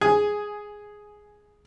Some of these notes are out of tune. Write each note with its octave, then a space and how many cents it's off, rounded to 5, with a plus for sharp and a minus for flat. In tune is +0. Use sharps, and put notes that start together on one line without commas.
G#4 +0 G#5 +10